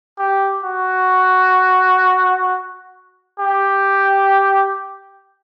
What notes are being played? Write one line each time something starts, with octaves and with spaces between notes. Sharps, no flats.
G4
F#4
G4